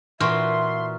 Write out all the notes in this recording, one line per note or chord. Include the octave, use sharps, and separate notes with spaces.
A#2 E3 F#4 E5 C6 C#6 F6